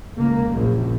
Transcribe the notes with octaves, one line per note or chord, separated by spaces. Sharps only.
C#2 A#3
A#1 F#2